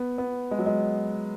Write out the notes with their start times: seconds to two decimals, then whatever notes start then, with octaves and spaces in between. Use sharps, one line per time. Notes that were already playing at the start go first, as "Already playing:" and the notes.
Already playing: B3
0.18 B3
0.51 G#3
0.59 F#3
0.66 G#3